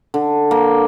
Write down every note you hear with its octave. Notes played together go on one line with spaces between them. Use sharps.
D3
A#3